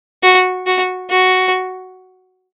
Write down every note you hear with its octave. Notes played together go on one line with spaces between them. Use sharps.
F#4
F#4
F#4